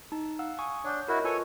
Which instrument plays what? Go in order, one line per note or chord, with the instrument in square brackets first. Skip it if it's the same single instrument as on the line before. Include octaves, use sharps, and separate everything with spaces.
[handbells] D#4 A5
F5 F#5 E6
G#5 C#6 D#6
[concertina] D4 [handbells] C#5 F#5 G6
[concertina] E4 F#4 [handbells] A#4 D#5
[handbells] F4 B4 C#6 [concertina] A4 C#5 G#5